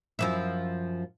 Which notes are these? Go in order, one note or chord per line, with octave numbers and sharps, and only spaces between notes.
F#2 F3 E4